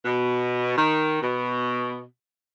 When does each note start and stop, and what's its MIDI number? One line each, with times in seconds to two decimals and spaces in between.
0.05 0.72 47
0.77 1.18 51
1.22 2.02 47